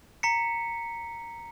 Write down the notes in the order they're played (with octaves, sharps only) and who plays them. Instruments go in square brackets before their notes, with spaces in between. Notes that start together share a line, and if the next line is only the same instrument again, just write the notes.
[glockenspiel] A#5 B6 C#7